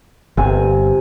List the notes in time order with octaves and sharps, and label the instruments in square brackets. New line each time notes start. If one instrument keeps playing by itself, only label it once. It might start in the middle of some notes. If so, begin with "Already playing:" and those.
[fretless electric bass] G1 [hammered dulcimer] C3 G#5